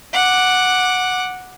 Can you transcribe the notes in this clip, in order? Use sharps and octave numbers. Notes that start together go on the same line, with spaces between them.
F#5 D6